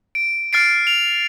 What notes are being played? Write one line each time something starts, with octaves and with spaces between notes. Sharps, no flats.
D7
F6 A6 C7 D7
F7